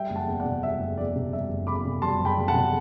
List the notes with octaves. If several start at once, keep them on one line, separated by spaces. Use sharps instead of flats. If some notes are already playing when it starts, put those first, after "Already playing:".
Already playing: G3 E5 G5
F#1
F#5 A5
E2
D5 F#5
C3
G3 E5
F#1
E2 D5
C3
G3 E5
F#1
E2 B5 D6
C3
G3 A5 C6
F#1
G5 B5
E2
F#5 A5
C3